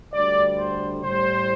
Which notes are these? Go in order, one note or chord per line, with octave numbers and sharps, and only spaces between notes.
D2 D3 G3 D5
C5
A2 G3 C5